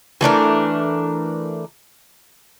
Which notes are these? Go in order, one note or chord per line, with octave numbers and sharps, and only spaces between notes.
E3 A3 D4 A#4